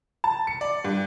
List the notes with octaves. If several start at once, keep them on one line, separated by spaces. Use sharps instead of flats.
A5
C#7
D5
G2